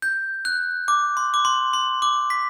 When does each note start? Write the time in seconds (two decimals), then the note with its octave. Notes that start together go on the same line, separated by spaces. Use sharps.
0.02 G6
0.45 F#6
0.88 D6
1.17 C6
1.34 D6
1.45 C6
1.73 C6
2.02 D6
2.30 B6